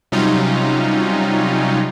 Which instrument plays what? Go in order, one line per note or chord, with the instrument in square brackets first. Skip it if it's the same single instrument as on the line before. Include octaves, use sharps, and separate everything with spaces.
[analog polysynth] C3 F#3 G3 C#4 D#4 F4